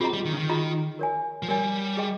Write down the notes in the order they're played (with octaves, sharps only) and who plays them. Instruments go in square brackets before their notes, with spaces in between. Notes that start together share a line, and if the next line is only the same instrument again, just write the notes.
[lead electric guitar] C4 [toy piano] F4 G#4 D#5 A#5
[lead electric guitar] G3
D#3
C#3
D#3
[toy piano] F4 G#4 D#5 A#5
A#4 C#5 G#5
[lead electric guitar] F3
[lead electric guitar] G3 [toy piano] A#4 C#5 G#5
[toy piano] G#4 D#5 G5